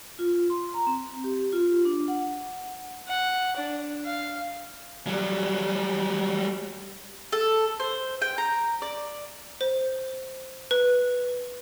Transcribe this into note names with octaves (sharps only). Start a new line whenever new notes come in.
F4
C6
A#5
C4
G4
F4
D4
F#5
F#5
D4
F5
F#3 G3
A4
C5
G5
A#5
D5
C5
B4